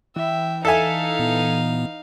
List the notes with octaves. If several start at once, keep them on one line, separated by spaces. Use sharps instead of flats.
E3 E5 G5
D#4 A4 E5 F5 G#5
A#2 B3